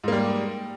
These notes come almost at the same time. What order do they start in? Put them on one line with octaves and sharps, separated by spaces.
G#2 A#3 G3